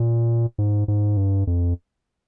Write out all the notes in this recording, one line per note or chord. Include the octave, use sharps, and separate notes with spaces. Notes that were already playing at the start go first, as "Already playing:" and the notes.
Already playing: A#2
G#2
G#2
G2
F2